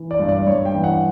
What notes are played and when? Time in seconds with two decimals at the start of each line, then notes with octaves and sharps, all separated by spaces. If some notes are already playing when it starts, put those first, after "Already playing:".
Already playing: E3
0.11 D5
0.19 G2
0.29 D5
0.47 G2 C#5
0.65 G5
0.75 E3
0.84 F#5